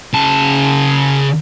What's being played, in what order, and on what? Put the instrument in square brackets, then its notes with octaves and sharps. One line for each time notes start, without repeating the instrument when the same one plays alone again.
[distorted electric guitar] C#3 A5